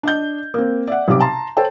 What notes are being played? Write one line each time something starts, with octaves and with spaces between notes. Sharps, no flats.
D4 D#5 G6
A#3 C4
D5 E5 F#5
B1 C3 G4 D6
A5 A#5 C6
A4 C5 C#5 G5 A5